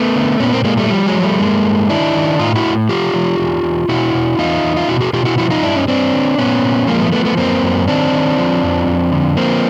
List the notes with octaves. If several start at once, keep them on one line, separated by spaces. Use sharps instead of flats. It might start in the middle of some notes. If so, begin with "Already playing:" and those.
Already playing: A3 B3
D3
A#2 B3 C#4
A#3 C4
A#2 G#3 A#3
G3 A3
F3 G3
F#3 G#3
F3
G3 A3
G2 G#3 A#3
G2
D#3 D4 E4
D#3
A2 D#4 F4
E4 F#4
A2
F3 F4 G4
F3
E2
E2
B2 E4 F#4
B2
E2 D#4 F4
E2
F4
B2 E4 F#4
F#4 G#4
B2 F4 G4
E4 F#4
F3 E4 F#4
D#4 F4
G2 D4 E4
C#4 D#4
G2 C4 D4
D3
A#2 B3 C#4
A#2
F3 G#3 A#3
A3 B3
F3 A3 B3
A3 B3
F#2 A#3 C4
F#2
D#3 C4 D4
D#3
F3
F2
F2
D3
F3 A#3 C4